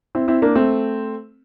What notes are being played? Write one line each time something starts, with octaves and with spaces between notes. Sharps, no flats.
C4 E4
C4 E4
A#3 D4
A3 C4